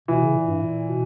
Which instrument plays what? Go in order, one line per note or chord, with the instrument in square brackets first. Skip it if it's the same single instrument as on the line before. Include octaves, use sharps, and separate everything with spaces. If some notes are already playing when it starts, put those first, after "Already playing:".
[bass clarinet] B2 [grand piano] E3
[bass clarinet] C#3
A#2
G2
A#2
B2